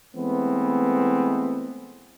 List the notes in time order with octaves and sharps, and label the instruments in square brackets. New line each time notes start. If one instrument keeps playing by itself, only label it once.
[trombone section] E3 G#3 A3 B3 C4